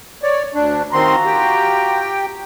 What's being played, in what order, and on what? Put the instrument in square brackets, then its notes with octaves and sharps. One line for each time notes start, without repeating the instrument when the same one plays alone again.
[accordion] C#5 D5
D2 D4
[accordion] D#3 C4 C6 [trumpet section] F4 F#4 A#5
[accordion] G4 G5